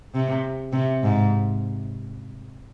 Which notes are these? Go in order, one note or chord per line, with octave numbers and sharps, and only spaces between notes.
C3
C3
G#2